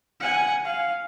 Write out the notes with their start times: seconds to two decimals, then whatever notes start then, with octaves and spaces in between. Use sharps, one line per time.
0.20 F#5 G#5
0.65 F5